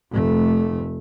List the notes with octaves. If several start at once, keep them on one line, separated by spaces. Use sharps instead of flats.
F1 A3